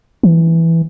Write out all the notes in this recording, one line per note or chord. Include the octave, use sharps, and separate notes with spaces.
E3